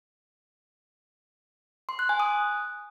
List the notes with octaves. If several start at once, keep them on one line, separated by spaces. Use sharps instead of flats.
C6
F#6
G#5
D#6